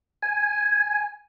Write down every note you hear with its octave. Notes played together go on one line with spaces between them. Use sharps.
G#5